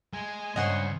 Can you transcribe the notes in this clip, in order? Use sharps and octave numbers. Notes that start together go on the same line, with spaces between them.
G#3 G#5
C#2 G2 C5 C#5 D#5 F#5 C6